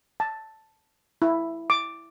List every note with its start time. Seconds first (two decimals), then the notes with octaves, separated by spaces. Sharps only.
0.20 A5
1.22 E4
1.70 D6